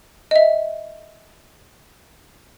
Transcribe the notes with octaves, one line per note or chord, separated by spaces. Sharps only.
D#5 E5